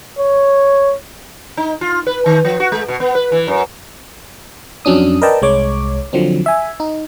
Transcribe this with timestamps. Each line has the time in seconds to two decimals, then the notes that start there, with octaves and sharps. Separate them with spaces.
0.19 C#5
1.57 D#4
1.81 F4
2.07 B4
2.26 D#3
2.45 F3
2.60 F#4
2.72 G#3
2.88 B2
3.00 B3
3.15 B4
3.32 E3
3.47 F#2
4.85 F2 F#3 C#4 D4 D#6
5.22 A#4 B4 D5 D#5 G5 A5
5.42 C2 G#3 C#5 D6
6.13 D3 F3 F#3 C4
6.46 E5 G#5
6.80 D#4